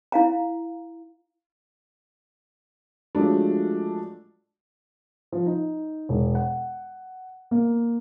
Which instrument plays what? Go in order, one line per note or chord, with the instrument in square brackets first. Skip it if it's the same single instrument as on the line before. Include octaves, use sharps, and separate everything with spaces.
[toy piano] E4 F5 A#5
[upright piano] F3 F#3 G#3 A3 D4
F3
D#4
E1
F#5
A#3